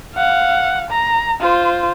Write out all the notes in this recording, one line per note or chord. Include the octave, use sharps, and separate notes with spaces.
F5 F#5
A#5
F4 C5